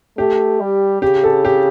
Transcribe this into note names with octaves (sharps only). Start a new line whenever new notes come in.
A3 G4
G3
C#3 G4
A4
G4